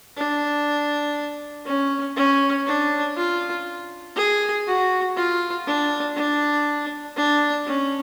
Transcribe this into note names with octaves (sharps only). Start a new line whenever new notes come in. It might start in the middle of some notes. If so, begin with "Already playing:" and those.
D4
C#4
C#4
D4
F4
G#4
F#4
F4
D4
D4
D4
C#4